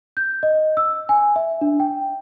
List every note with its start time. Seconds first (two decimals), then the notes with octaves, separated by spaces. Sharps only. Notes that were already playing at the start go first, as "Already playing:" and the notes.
0.17 G6
0.43 D#5
0.77 E6
1.09 G#5
1.36 E5
1.61 D4
1.80 G5